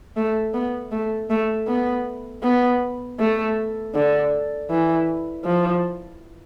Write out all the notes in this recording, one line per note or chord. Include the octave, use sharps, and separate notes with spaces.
A3
B3
A3
A3
B3
B3
A3
D3
E3
F3